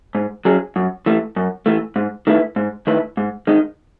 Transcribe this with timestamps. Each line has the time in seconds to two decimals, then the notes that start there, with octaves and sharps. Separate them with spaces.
0.15 G#2
0.45 F#3 C#4 G#4
0.76 F#2
1.06 E3 A3
1.36 F#2
1.66 E3 A3
1.96 G#2
2.27 D#3 A3 E4 B4
2.56 G#2
2.87 D#3 A3 E4 B4
3.17 G#2
3.47 D#3 G#3 D#4